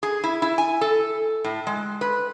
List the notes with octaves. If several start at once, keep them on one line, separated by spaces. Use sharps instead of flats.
G#4
E4
E4
G#5
A4
A2
G#3
B4